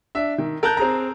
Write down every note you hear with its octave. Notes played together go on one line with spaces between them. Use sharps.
D4 E5
D#3
A#4 A5 F#6 G6
C4 G#4 A#5